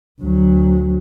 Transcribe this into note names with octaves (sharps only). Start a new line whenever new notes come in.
D2 F#3